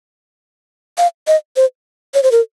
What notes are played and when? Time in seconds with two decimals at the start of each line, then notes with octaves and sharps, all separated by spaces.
0.98 F5
1.27 D#5
1.56 C5
2.14 C#5
2.23 C5
2.32 A#4